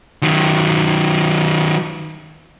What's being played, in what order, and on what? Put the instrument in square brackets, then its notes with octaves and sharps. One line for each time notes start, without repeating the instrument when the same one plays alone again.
[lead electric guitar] D#3 F#3